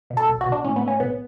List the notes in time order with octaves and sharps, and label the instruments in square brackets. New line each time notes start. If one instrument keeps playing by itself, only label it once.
[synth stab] B2
A4
B1
F#4
B2
D4
A2 C#4
B3
A2
C#4
B1 B3